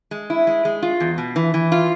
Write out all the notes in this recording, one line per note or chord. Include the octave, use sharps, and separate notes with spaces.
G#3
E4
G#3
G#3
F4
E2
B2
E3
E3
F4